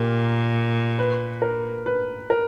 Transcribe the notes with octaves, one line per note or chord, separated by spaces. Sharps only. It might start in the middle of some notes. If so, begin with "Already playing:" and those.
Already playing: A#2 G4 A#4
B4
A#4
B4
A#4